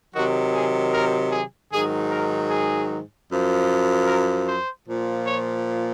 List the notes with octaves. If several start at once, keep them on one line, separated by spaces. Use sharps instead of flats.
C3 D#3 F#3 F#4
G#4
A#4
G#4
G#2 D#3 F#3 G#4
A#4
G#4
F#2 F3
A#4
C5
A#2 F3
C#5